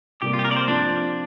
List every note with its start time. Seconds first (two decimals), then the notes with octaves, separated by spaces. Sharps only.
0.22 C3 G3 A#3 G4
0.33 F4
0.39 G4
0.45 A#4
0.51 D5
0.56 C5
0.68 F3 C4 D4 F4